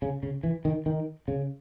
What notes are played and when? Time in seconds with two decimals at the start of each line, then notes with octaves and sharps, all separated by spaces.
0.02 C#3
0.23 C#3
0.43 E3
0.65 D#3
0.86 D#3
1.28 C#3